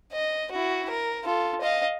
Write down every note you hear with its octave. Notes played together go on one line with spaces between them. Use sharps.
D#5
E4 F#4
A#4
F4 A4
D#5 F5